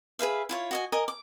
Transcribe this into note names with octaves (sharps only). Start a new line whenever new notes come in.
G#4 B4 E5 F5
E4 F4 C#5
F#4 D#5 G#5
A#4 D#5 G#5 D#6
D6